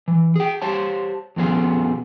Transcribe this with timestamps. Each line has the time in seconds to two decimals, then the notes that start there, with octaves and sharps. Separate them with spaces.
0.08 E3
0.36 G#4 G5
0.62 G4 C5 C#5 A5
1.36 F2 B2 F3 B3 C#4 G#4